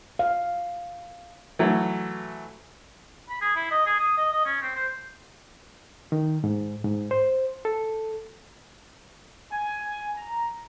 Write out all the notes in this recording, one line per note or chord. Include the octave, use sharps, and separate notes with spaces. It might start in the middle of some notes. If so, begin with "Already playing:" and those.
F5
E3 F#3 A3
B5
G#4
E4
D#5
G#4
D#6
D#5
D#5
C#4
C4
C5
D#3
G#2
G#2
C5
A4
G#5
A#5